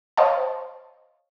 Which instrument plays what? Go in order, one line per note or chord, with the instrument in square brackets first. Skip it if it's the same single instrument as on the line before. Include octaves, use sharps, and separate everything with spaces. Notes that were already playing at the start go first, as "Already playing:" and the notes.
[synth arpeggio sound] C5 C#5 D#5 F5 G5 A5